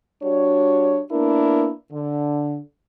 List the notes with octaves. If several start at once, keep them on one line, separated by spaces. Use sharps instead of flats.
G3 D4 F#4 C#5
A#3 B3 D4 E4 A#4
D3